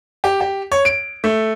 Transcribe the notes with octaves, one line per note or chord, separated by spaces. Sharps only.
G4
G4
C#5
D7
A3